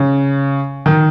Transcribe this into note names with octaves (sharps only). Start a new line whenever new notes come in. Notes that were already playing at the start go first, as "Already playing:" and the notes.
Already playing: C#3
D#3